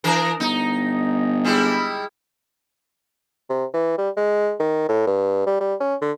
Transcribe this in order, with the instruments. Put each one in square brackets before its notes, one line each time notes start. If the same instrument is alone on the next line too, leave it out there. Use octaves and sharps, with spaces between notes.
[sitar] E3 D4 A#4
[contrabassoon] G1 [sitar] D#4
[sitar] G3 G#3 E4
[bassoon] C3
E3
G3
G#3
D#3
A2
G2
G3
G3
C#4
D3